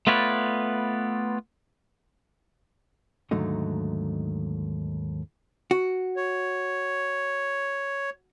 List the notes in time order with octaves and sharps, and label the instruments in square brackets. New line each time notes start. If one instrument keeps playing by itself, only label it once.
[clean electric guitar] A3 B3 F4 B4 C#5 D5
[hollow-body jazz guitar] D#2 G#2 D3 F#3 A3 D#4
F#4
[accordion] C#5